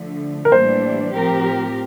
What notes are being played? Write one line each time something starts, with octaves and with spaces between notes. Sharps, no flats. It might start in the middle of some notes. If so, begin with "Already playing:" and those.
Already playing: D3 F3 A3
A#4
A2 E3 G3 A#3 D4 C5
A2 F3 C4 G4 A#4